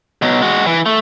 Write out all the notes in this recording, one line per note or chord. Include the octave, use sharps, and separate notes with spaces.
B2 F#3
G#3 F#4
E3
A3